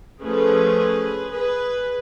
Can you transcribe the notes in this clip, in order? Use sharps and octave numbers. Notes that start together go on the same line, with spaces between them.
F3 A3 C#4 G#4 B4
G#4 B4